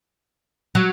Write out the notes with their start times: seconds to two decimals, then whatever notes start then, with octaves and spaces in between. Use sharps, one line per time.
0.75 F#3